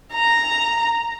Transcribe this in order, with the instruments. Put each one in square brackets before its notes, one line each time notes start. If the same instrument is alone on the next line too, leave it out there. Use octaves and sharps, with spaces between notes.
[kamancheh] A#5